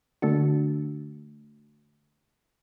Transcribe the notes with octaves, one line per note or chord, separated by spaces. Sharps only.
D3 A3 D4 F#4